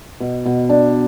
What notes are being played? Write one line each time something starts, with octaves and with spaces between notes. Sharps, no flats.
B2
B2
D4